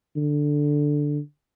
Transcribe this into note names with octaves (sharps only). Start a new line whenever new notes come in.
D3